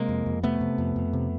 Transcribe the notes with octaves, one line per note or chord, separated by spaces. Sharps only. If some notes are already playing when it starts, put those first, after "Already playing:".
Already playing: C3 G#3 A#3
F2
F2
C3 A3 B3
C3
F2
F2
C3